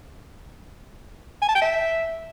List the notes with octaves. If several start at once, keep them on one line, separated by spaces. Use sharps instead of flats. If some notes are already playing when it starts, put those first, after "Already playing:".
G#5
A5
G5
E5